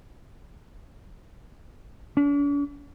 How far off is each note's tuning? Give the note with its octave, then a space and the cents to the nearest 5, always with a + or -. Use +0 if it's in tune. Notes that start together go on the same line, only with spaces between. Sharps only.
D4 -45